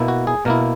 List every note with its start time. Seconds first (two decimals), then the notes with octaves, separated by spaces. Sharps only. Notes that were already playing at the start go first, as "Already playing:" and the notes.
Already playing: B2 A#3 E4
0.08 F#4
0.27 G#4
0.45 B2 A#3 E4 A#4